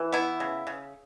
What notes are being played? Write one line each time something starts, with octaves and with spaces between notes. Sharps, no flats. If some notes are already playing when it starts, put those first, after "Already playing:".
Already playing: E3
B3 E4
C#3
C#3